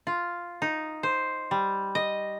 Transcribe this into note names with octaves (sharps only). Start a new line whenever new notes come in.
F4
D#4
C5
G3
D#5